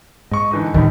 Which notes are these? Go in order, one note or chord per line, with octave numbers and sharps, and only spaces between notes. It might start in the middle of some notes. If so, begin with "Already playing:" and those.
G#2 D#5 C#6
D3 E3 D#4
A#1 A2 D#3 G3 E4